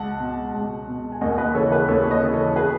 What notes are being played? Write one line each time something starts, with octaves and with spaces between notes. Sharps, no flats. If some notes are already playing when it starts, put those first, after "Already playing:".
Already playing: C#2 F#5 A5
B2
C#2
B2
G#5
D#2 D#5 F#5
B4 D#5
C#3 E3 A4 C#5
G#4 B4
D#2 A4 C#5
C#5
B4 D#5
C#3 E3
A4 C#5
G#4 B4